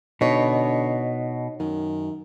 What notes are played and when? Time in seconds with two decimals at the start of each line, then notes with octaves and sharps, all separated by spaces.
0.21 B2 D3 D#4 C#5
1.60 F#2 D#3